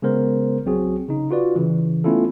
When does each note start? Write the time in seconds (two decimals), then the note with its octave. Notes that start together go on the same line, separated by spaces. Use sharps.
0.02 C#3 G#3 B3 A#4 C5
0.66 B1 F#3 C4 F#4 G#4
1.09 C#3 D#4
1.31 F4 F#4 B4 D5
1.56 C#3 E3
2.04 A3 B3 C#4 E4 F4 A4